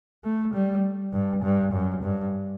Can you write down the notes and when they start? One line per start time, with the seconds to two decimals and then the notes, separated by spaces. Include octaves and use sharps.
0.24 A3
0.54 G3
1.13 G2
1.43 G2
1.72 F#2
2.03 G2